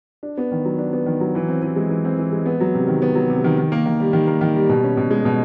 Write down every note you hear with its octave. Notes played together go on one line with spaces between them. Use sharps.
D4
B3
D#3
F#3
D4
B3
D#3
F#3
E3
C4
E3
G#3
E3
C4
E3
G#3
B3
F#3
C3
D#3
B3
F#3
C3
D#3
D#3
A#3
D#3
G3
D#3
A#3
D#3
G3
B2
C#4
B2
G#3
B2